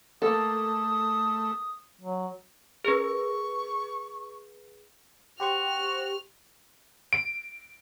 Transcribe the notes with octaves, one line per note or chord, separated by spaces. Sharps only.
A3 A#3 A4 D#6
F#3
C#4 G#4 A#4 B4 C#6
F#4 G4 C5 C#6 F6
D7